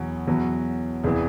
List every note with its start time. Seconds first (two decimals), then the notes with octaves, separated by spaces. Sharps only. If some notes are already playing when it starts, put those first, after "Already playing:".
Already playing: E2 B2 F#3
0.27 E2 B2 F#3
1.04 E1 C3 E3